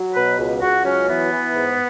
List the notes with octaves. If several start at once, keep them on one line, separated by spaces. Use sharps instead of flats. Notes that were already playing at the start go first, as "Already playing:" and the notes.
Already playing: F#3
B2 B4
C#2
C#2 F#4
F#3 C#4
E3 B3
E3
G#2